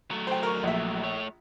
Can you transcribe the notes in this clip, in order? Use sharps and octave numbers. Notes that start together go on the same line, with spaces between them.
F#3 A3
C5 G5
A#4 C#6
A#1 E5
A3 C#5